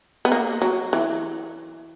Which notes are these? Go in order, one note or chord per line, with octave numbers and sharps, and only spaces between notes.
B3
A#3
F#3
E3